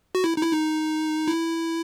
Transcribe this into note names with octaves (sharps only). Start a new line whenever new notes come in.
F#4
E4
D#4
E4
D#4
E4